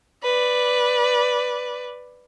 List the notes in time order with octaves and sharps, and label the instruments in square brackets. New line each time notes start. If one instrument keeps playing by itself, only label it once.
[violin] B4 D5